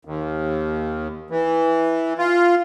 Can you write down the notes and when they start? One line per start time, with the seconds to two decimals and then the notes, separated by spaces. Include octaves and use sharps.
0.05 D#2
1.30 E3
2.18 F4